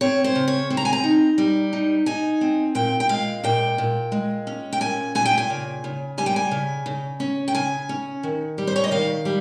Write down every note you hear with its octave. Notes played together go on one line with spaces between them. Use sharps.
C4 C#5
C5
C#3
C#5
C4
A#5
G#5
A#5
D#4
G3
D#4
D#4 G#5
C4
A#2 G5
G5
G#3 F5
A#2 G5
A#2
G#3
C#4
G5
A#2 G#5
A#2 G#5
G5
G#5
C#3
C#3
G3 G#5
G5
G#5
C#3
C#3
C#4
G5
C#3 G#5
C#4
D#3
G3
C5
C#5
D#5
D#3 F5
G3